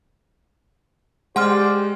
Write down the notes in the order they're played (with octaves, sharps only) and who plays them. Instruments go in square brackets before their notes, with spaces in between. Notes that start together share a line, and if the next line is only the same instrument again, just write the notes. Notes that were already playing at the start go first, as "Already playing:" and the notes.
[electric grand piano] G#3 [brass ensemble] G4 C5 D5 [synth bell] F#5 C6 F6